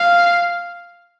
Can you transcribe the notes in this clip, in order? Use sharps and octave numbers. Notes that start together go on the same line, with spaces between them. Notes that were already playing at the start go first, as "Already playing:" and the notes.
Already playing: F5